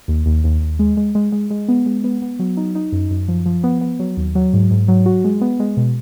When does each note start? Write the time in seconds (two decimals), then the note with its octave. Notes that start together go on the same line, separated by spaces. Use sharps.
0.08 D#2
0.26 D#2
0.44 D#2
0.62 D#2
0.79 G#3
0.97 G#3
1.15 G#3
1.32 G#3
1.50 G#3
1.68 B3
1.86 G#3
2.04 B3
2.22 B3
2.39 F#3
2.57 D#4
2.75 D#4
2.92 F#2
3.10 F#2
3.28 F3
3.46 F3
3.64 B3
3.81 B3
3.99 F#3
4.17 D#2
4.35 F#3
4.53 G#2
4.71 G#2
4.88 F#3
5.06 F#4
5.24 G#3
5.41 B3
5.60 G#3
5.77 B2